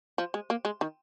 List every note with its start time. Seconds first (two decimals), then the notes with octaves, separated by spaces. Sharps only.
0.18 F3
0.34 G#3
0.50 A#3
0.65 G#3
0.81 D#3